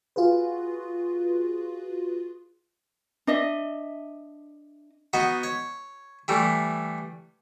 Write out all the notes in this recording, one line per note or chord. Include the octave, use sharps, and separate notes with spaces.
F4 F#4 G#4 B4
D4 D#5 E5
B3 D#4 F#4 F#5
C#5
E3 G3 A3